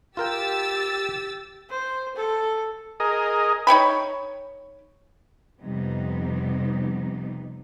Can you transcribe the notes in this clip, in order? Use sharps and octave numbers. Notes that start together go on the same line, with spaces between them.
F4 G4 A#4 G5 E6 A6
C5
A4
G#4 A#4 D#5
D#4 C#5 G5 B5
F2 C3 G3 B3 D#4